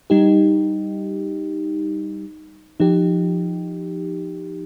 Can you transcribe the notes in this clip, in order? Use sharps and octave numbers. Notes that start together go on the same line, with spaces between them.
G3 D#4 G4
F3 D#4 G4